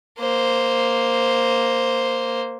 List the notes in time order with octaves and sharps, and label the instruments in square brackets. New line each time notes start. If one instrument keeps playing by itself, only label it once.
[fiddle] A#3 C5